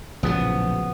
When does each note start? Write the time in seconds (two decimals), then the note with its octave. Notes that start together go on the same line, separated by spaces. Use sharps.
0.23 A#1 A2 C#3 F3 F#3 B3 G#4